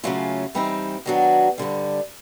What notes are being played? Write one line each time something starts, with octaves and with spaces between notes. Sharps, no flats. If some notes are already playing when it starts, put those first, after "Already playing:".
C#3 F#3 A3 C#4 F4
E3 G3 C4 D#4
D#3 F#3 B3 D4 F#4
G2 D3 G3